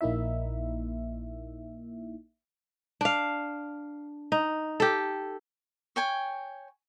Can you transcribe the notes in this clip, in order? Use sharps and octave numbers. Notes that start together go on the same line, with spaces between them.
A#1 A#3 D#4 E4 E5
D4 F5
D#4
G4 A4
C#5 G5 G#5